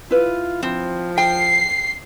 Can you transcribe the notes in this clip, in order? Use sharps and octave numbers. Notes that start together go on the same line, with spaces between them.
E4 F4 B4
F3 C4
G5 C7